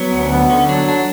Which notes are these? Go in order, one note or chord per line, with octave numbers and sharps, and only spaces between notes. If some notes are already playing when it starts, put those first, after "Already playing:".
Already playing: F#3 B3
D2
B3
D3 C#4
F#3 D4
D4